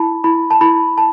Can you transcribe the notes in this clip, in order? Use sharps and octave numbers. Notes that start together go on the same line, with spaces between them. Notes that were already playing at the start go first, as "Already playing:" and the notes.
Already playing: E4 A5 B5
E4 B5
A5
E4 B5
A5